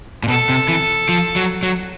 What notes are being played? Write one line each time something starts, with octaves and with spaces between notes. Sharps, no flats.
A#2
B2 A4
C3
E3
F3
F#3
F#3